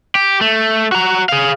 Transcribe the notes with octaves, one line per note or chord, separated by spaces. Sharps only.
G4
A3
F#4 A#5
G#4 F5